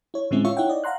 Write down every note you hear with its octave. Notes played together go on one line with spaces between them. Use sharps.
E4 C#5
A2 D3 G#3 C4 C#4 E4
F4 C#5 E5 C#6
D#4 E4 C#5 E5 F#5 G5
D5 D#5
F5 F#5 A#5 C6 F#6